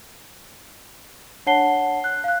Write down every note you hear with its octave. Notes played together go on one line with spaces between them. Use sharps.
D4 C#5 F#5 A5 C7 G7
F#6
F5 F#6